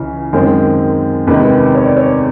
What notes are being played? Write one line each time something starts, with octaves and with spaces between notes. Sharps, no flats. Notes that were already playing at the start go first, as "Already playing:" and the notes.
Already playing: C#2 C#3 E3
F#2 D#3 G#3 C4
E2 C3 D#3 G#3 B4
C#5
D5
C#5